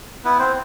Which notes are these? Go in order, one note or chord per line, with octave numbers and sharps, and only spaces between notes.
B3 E4 B4
C4 C5